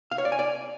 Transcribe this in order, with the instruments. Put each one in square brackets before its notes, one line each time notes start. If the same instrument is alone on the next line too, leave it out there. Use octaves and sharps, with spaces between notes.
[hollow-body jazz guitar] F5
C#5
D5
G#5
D5